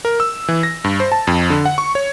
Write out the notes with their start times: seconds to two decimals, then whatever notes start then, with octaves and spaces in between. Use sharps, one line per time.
0.05 A#4
0.20 E6
0.48 E3
0.63 A#6
0.84 G2
1.00 C5
1.12 A5
1.27 F2
1.50 D3
1.65 F#5
1.78 C#6
1.95 C#5